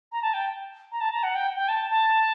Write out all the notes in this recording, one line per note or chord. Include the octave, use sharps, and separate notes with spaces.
A#5
A5
G5
A#5
A5
A#5
F#5
G5
G5
A5
A5